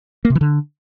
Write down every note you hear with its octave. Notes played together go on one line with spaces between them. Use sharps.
A#3
C3
E3
D3